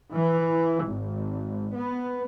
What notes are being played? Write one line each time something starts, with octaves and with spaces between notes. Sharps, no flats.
E3
G#1
B3